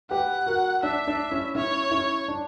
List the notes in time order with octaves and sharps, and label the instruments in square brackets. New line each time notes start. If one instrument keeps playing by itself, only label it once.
[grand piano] G4 B4 [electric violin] F#5
[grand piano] F#4 A#4
[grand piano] D4 [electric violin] E5
[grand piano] D4
C#4 E4
[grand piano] C#4 E4 [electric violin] C#5
[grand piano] C#4 E4
D4